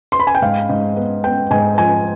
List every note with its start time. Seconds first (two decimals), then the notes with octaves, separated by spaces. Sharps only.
0.12 C6
0.20 B5
0.27 G#5
0.35 G5
0.42 G#2 F5
0.70 G#2
0.96 B3
1.24 B3 G5
1.51 G#2 G#5
1.78 F3 G#5